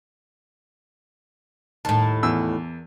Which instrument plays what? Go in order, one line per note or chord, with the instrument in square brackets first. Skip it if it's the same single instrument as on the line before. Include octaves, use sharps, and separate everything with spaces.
[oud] D#2 A2 [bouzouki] A#4 A5
[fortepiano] E2 E6